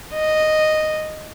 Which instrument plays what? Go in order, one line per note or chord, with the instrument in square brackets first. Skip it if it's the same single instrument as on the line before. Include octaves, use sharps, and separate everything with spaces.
[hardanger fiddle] D#5